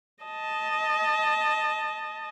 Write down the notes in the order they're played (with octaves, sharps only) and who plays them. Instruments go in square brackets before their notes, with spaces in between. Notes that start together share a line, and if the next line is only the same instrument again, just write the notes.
[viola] D#5 A5